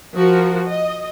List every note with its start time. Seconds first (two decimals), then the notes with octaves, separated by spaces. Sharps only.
0.15 F3 F#4 A#4
0.69 D#5